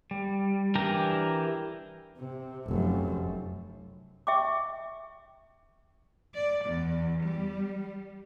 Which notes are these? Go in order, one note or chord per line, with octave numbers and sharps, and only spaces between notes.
G3
E3 D4 G4 A#4 A#5
C3
F1 F#2
E5 G5 C#6 D6
D5
E2
G3